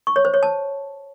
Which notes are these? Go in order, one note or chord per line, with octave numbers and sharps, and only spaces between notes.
C#6
C#5
C5
C#5
A5